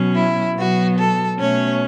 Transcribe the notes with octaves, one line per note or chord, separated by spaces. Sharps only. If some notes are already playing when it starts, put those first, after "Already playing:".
Already playing: B2 F#3 C#4
E4
B2 F#3 B3 F#4
A4
B2 A3 C#4 C#5